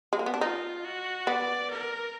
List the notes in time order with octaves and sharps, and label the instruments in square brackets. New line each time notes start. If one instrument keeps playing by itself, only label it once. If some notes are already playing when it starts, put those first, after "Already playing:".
[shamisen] G#3
A#3
B3
D4
[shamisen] D#4 [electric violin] F4
[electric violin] F#4
[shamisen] B3 [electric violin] D5
[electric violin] A#4